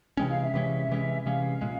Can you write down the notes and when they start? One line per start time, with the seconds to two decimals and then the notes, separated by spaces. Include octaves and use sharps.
0.17 C3 E3 G#3 C#4 G5
0.29 F5
0.42 E5
0.54 C3 E3 G#3 C#4
0.89 C3 E3 G#3 C#4
1.25 C3 E3 G#3 C#4 F5
1.61 A#2 G#3 C#4